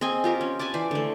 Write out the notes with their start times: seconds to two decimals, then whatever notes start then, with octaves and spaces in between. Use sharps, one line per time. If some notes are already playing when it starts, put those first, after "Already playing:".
0.01 C4 G#4 D#5 G#5
0.24 F4 G4 A#4
0.41 C#4
0.59 B4 G#5 A5 D6
0.74 E3 C5 D5
0.91 D3 A3